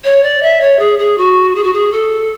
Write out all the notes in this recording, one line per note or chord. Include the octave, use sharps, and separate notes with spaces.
C#5
D5
E5
C#5
G#4
G#4
F#4
G#4
F#4
G#4
A4